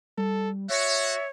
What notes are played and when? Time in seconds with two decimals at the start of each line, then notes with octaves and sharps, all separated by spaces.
0.18 G3 A4
0.70 F#4 C#5 E5 A6